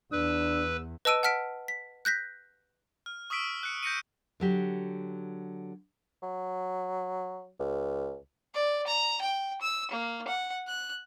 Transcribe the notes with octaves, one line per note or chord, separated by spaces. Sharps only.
E2 D4 B4 E6
B4 D#5 A5 E6 D7 D#7
F#5 A5 F6 B6 D7
B6
F#6 G6 A#6 B6
F6
C#6 D#6 E6 B6 D7
F#6 C#7
G6 A#6 C#7 D#7
D3 F#3 G4
F#3
C#2
D5
A#5
G5
E6
A#3
F#5
F#6